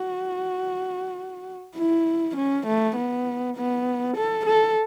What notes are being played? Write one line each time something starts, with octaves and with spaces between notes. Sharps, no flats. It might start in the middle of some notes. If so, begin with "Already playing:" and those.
Already playing: F#4
E4
C#4
A3
B3
B3
A4
A4